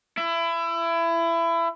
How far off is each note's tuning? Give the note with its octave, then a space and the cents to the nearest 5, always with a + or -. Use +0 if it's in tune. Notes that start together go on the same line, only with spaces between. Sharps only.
E4 +25